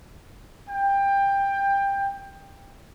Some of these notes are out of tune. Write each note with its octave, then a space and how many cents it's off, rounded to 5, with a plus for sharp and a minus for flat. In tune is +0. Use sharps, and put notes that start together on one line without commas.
G5 +20